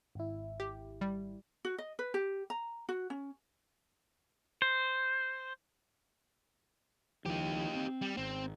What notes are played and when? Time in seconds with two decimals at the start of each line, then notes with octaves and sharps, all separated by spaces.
0.15 G#1 E4
0.60 G4
1.01 G3
1.65 F#4
1.78 D#5
1.99 B4
2.14 G4
2.50 A#5
2.89 F#4
3.10 C#4
4.62 C5
7.26 C#2 D#3 F3 D#4 G4
7.75 C4
8.01 G3
8.17 G#1 C4